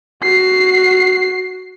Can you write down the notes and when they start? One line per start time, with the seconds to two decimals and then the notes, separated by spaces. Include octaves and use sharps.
0.23 F#4 C7